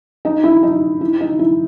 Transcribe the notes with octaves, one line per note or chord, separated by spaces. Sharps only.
D#4
E4
D#4
E4
D#4
E4